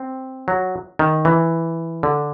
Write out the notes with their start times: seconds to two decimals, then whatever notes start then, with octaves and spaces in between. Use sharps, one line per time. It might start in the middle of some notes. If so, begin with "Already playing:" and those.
Already playing: C4
0.48 F#3
0.99 D#3
1.25 E3
2.03 D3